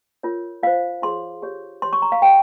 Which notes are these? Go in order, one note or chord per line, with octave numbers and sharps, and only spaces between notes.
F4 A#4 C#5
F4 C5 F5
F4 G#4 C#5 C6
G4 C#5
G4 C#5 C6
C#6
A#5
F5
G4 C#5 G5